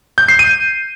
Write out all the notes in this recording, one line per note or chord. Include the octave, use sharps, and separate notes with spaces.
G6
C7
D#7